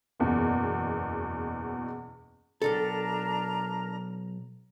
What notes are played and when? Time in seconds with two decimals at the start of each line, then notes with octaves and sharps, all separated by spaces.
0.20 F#1 E2 B2
2.62 B1 G#2 D4 A4 A#4 A#5